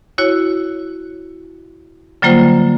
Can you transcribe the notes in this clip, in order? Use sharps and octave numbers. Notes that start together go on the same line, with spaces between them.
E4 F#4 C#5
D3 F#3 G3 A#3 F4 C5